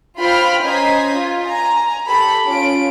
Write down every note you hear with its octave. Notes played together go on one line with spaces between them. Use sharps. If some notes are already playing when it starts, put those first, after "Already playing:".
F4 C5 G5 B5 F6
C#4 C5 D#5 A#5 G#6 B6
F4
G#5 A#5
G4 A4 B5
C#4 F4 D7